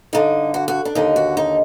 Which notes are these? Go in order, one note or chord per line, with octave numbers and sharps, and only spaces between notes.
G2 D3 D#4
F#4
F#4
D4
D#2 D3 D#4
F#4
D#4